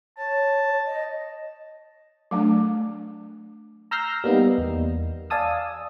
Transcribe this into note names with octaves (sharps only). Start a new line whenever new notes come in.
C#5 A5
D#5
F#3 A3 D4
A#5 E6 F6 G6 A#6 C7
G3 A#3 B3 D#4
E2
D5 F5 G#5 A5 D#6 E6